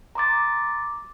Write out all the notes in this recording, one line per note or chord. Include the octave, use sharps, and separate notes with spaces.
A#5 C6 D6 A6